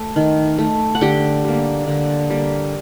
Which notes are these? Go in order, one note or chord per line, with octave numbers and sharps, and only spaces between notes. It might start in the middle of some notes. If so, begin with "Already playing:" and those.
Already playing: A3
D#3
A3
F#5
D3 G4 G5
G3 A#3
D3
G3 A#3